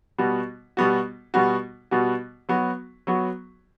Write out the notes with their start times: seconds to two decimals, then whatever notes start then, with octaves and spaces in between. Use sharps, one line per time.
0.18 B2 G3 B3 F#4
0.77 B2 G3 B3 F#4
1.34 B2 G3 B3 F#4
1.91 B2 G3 B3 F#4
2.49 F#3 B3 F#4
3.07 F#3 B3 F#4